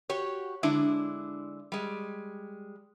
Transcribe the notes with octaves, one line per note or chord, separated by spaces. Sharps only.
F#4 G4 C#5
D3 G#3 D4 E4
G3 G#3